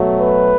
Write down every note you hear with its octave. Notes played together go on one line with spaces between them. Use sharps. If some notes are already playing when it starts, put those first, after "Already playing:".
Already playing: B2 F#3 A3
B4